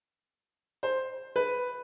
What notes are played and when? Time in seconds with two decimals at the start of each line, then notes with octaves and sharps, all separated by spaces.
0.83 C5
1.36 B4